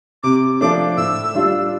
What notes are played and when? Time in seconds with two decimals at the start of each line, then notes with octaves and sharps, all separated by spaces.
0.23 C3 D6
0.61 F3 A3 D4 D6
0.97 A2 E6
1.35 G3 D4 F4